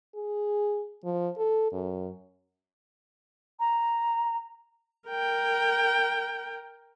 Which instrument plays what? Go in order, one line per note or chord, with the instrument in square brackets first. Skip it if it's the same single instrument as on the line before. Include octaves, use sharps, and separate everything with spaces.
[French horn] G#4
F3
A4
F#2
[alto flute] A#5
[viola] A#4 G5